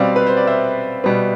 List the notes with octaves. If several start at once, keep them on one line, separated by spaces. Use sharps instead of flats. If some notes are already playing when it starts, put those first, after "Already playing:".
Already playing: B2 G3 C4 D5 F5
B4
C5
D5
C5 E5
B2 G3 B3